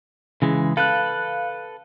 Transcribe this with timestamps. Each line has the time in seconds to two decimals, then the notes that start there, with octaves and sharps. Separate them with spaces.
0.42 C#3 E3 G#3
0.77 A4 B4 F5 F#6